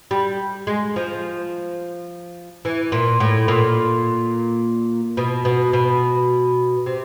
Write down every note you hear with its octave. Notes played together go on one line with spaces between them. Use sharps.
G3
G#3
F3
E3
A#2
A2
A#2
B2
B2
B2
C3